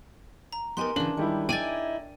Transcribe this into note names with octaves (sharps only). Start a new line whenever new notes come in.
A#5
B3 D#4 G4 A#4 G#5 C6
C#3 E3 D4 F#7
D#3 G3 G#3 E4
D#4 E4 D5 G5 G#5 A6 D#7